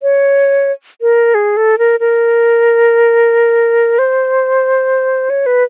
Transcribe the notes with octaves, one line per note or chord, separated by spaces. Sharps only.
C#5
A#4
G#4
A4
A#4
A#4
C5
C#5
B4